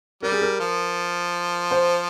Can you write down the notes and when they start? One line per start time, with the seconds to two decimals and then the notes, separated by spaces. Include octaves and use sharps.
0.23 G3 A#4
0.32 G#4
0.41 A#4
0.60 F3
1.71 C5